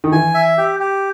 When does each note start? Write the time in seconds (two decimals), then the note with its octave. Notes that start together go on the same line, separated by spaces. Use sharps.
0.04 D#3
0.12 E3 G#5
0.34 E5
0.58 G4
0.80 G4